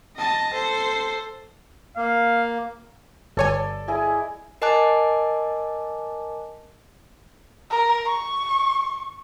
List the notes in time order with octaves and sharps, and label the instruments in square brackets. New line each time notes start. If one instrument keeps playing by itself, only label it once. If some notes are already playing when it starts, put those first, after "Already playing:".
[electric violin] D#5 A5
A4 C5
[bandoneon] A#3 [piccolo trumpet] F5
[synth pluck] G1 C#5 G#5 [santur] A4 D5
[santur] E4 G#4 D#5
[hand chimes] A#4 D#5 G#5 A5 D6 F#6
[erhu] A#4
C#6